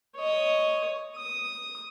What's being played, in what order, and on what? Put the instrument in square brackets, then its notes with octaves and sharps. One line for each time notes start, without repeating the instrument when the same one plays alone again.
[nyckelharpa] C#5 D#5
D#6